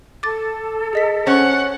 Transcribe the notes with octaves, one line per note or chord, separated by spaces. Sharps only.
A4 D6 A6
G#4 D#5 B6
C#4 C5 F#5 C#6